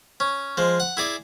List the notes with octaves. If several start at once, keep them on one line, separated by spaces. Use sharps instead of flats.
C#4
F3 G#3
F#5
E4 G#4 D5